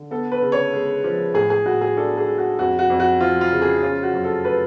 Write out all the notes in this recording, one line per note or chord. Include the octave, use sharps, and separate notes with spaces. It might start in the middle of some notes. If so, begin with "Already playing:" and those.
Already playing: D3
B3 A4
B4
C#3
C#5
G#3
F3
A2 G#4
G#4
A2 F#4
G#4
D4 A4
G#4
G#3
F#4
F2 F#4
F#4
F2
F#4
F3 F4
F4
C#3
G#4
C#4 F4
F#4
F#2
A4
A3 B4